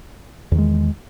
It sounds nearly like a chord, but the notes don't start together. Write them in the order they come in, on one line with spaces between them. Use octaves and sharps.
E2 D#3 G#3